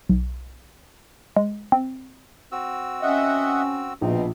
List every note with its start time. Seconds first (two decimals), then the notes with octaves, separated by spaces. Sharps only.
0.09 B1
1.37 G#3
1.72 C4
2.52 C4 F#4 E6
3.02 C#4 D#5 E5 F#5
4.01 A#1 B2 C4 D#4